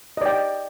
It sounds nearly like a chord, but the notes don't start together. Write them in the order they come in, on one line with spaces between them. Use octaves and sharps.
D#5 D5 G5